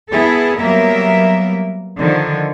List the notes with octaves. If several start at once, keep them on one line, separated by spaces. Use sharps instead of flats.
B3 E4 G#4 A4
F#3 G3 A#3 B3 A#4 E5
D3 D#3 F3